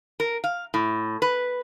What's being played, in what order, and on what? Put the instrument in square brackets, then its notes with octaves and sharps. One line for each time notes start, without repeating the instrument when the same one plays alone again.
[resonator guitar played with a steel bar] A#4
F5
A2
B4